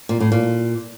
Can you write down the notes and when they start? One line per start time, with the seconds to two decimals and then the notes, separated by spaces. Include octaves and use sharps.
0.09 A#2
0.20 A2
0.32 A#2